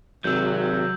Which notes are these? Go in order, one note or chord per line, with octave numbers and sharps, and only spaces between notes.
G#1 C3 F#3 E6 G6